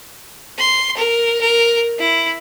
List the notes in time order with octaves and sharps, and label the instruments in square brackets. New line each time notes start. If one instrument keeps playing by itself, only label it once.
[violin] C6
A#4
A#4
E4